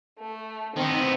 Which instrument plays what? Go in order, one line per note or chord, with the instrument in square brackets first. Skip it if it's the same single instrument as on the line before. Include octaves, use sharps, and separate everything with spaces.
[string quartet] A3
[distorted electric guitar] D#3 B3 [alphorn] C4 [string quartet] D#4